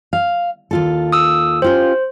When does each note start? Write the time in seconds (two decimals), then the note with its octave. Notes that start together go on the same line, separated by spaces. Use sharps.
0.13 F5
0.71 D#2 F4 A4
1.12 D#6 E6
1.62 C#4 F4 G4 C5